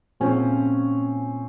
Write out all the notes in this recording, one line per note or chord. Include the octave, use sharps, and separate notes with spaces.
A#2 F3 C4 C#4